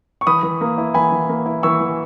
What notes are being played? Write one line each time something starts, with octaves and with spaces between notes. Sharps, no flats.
C#6
E3 B5 D#6
E3
A#3
E4
E3 G#5 B5
E3
A#3
E4
E3 C#6 E6
E3